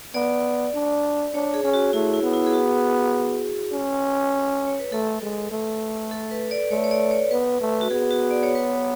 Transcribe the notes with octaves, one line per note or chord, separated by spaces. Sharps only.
B3 D5
D4
D4 C#5
G#4
C#4 G#4
F#4
A3 E4
E4
B3
E4
G#4
F#4
C#4
C#5
B4
A3 A4
G#3
A3
A4
B4
D5
A3 C#5
C#5
D5
C#5
B3 B4
A3
F#4
B3 G#4
F#4
D5
C#5
B4
C#5